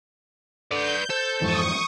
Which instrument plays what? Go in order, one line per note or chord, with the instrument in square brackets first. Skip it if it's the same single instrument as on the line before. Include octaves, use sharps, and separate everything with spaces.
[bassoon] D3 [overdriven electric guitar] B4 D5 [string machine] G6
[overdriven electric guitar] A4 [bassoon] C5
[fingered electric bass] F2 G#2 E3 [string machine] C#6 D#6